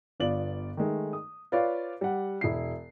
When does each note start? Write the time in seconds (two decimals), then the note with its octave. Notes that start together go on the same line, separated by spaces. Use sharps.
0.20 G1 B3 F4 D5 F#7
0.77 D#3 G#3 A3
1.13 D#6
1.52 F4 B4 C#5 D5 F5
2.01 G3 F#5
2.41 E1 E4 C7